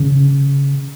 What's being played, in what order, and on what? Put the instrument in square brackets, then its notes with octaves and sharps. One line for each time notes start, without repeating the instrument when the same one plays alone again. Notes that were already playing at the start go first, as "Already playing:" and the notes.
Already playing: [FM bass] C#3